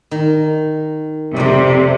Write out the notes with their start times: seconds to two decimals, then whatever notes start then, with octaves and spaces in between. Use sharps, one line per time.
0.11 D#3
1.36 F2 C3 D5